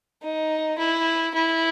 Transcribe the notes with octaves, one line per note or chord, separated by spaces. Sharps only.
D#4
E4
E4